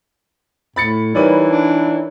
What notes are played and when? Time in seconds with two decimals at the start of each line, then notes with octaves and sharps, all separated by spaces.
0.76 A2 B5 A6 C#7
1.15 E3 G3 D#4 F#4 A#4 B4 C#5 D5
1.45 D4